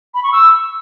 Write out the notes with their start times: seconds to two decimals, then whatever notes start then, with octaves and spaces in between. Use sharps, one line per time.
0.14 B5
0.23 C#6
0.32 E6